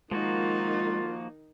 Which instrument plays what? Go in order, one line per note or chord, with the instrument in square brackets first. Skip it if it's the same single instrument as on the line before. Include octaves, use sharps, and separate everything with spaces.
[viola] D#3 D#4 [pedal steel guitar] F3 A#3 F#4 [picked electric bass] G#3 [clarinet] F4